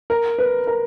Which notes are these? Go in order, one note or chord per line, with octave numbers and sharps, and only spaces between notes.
A#4
B4
A#4